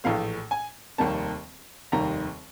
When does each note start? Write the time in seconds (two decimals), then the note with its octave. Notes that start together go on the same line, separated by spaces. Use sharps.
0.04 A#1 A2 E3 A3 F5
0.51 G#5
0.98 F1 D#2 D#3 G3 A#3 A5
1.92 F1 D#2 D#3 G3 A#5